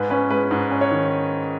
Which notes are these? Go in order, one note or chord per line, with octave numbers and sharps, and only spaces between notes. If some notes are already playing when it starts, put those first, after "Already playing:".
Already playing: G#2 B4
C#4 B4
G#3 B4
G#2
C#4
C#5
D#3